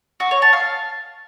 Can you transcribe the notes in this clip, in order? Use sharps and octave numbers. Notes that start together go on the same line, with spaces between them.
F#4
C#5
A5
F5